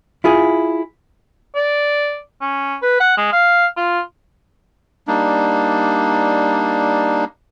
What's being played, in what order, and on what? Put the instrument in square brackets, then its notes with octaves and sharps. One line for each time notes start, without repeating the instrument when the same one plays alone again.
[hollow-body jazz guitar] E4 F4 G#4
[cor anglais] D5
C#4
B4
F#5
G#3
F5
F4
[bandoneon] G3 A#3 D4 D#4